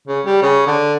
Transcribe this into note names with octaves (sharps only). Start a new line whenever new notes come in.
C#3
G3
C#3
D3